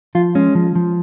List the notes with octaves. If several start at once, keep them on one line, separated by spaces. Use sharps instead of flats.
F3 F4
G#3 C#4
F3
F3